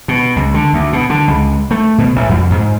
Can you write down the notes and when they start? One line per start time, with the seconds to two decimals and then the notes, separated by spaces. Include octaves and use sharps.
0.08 B2
0.36 C#2
0.54 D3
0.73 D2
0.93 B2
1.10 D3
1.28 C#2
1.71 A3
1.98 B2
2.16 A1
2.29 F2
2.51 G#2